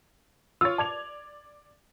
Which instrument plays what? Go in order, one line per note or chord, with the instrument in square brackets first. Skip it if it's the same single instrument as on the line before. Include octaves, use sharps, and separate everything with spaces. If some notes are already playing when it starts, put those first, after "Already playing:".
[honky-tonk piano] F4 C#5 [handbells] E6 A6
[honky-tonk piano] D5 G#6 F7 [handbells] A5